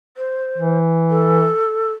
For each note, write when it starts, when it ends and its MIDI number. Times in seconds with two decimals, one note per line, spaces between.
0.17 0.78 72
0.58 1.48 52
1.10 1.93 69